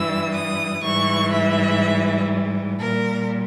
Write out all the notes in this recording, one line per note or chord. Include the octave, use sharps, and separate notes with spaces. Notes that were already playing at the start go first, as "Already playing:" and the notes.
Already playing: G2 E3 G3 E6
D#6
G#2 E3 G3 C#6
E5
A#2 G3 A#4